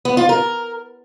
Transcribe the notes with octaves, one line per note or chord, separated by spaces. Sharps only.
B3
F4
A#4